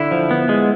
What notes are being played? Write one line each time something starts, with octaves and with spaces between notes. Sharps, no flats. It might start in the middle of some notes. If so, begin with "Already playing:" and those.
Already playing: D3 E4
F3
B3
G#3